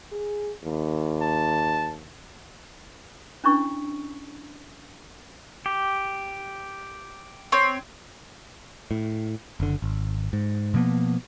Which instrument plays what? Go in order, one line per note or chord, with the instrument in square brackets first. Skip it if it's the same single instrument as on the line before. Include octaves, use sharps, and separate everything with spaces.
[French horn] G#4
D#2
[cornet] A5
[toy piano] C#4 D4 E4 C#6
[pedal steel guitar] G4
[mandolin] C4 C#5
[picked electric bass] A2
F#1 D3
G#1
G#2
B2 F3 A#3 B3